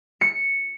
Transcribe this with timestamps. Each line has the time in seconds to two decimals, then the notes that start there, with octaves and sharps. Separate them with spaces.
0.21 C#7